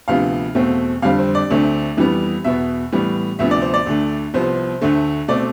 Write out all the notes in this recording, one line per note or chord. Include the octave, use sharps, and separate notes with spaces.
D2 C3 F3 B3 F5
E2 B2 A3 C4
F2 D3 G3 C4 F5
C5
D5
D2 D3 A3 C4
F2 E3 G3 B3
E2 B2 B3 E5
A2 E3 G3 B3
D2 C3 F3 B3 E5
D5
C5
D5
D2 D3 A3
C2 C3 F3 B3 C5
D2 D3 A3
B2 A3 C4 D5